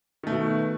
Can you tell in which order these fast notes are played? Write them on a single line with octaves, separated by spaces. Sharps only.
D#3 A3 B2